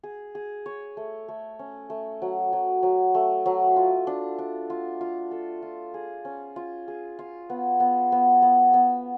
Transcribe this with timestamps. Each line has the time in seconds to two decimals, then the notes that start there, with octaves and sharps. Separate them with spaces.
0.03 G#4
0.35 G#4
0.66 C#5
0.97 A3
1.28 A3
1.59 C#4
1.90 A3
2.22 F#3
2.53 F#3
2.83 F#3
3.15 A3
3.46 F#3
3.76 F4
4.07 D4
4.39 D4
4.70 F4
5.01 F4
5.31 A4
5.62 F4
5.94 G#4
6.25 C#4
6.56 F4
6.88 G#4
7.19 F4
7.50 B3
7.80 B3
8.12 B3
8.42 B3
8.74 B3